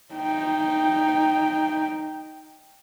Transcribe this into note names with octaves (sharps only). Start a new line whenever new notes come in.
D#4 G5